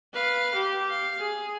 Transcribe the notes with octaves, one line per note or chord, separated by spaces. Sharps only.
B4 F5
G4
F5
G#4